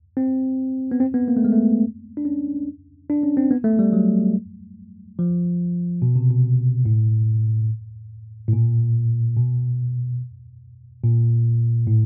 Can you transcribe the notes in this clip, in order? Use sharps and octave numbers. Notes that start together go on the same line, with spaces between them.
C4
B3
C4
B3
A#3
A3
G#3
A3
D4
C#4
D4
C#4
C4
B3
A3
G3
F#3
F3
B2
C3
B2
A2
A2
A#2
B2
A#2
A2